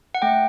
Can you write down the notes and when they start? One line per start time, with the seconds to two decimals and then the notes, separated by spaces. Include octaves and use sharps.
0.15 F#5
0.22 A3 G5